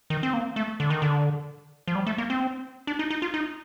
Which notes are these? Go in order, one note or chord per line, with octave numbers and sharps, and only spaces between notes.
D#3
C4
A#3
A3
D3
D#3
D3
F3
G3
A3
A#3
C4
D4
D#4
D#4
F4
D#4